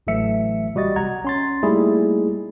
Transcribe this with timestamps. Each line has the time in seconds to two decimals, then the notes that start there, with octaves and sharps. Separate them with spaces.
0.07 A1 E3 F#3 A3 E5 C#7
0.75 C3 G3 F#4 D#5 A6
0.96 B1 F#5 A#5 G#6
1.24 C#4 C6 A6
1.63 G3 A3 A#3 D#4 E4 G#4